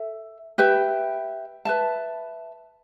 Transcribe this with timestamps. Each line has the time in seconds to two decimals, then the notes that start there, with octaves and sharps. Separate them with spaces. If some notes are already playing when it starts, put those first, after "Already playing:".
Already playing: A4 E5
0.58 G4 B4 E5 G5
1.65 B4 E5 A5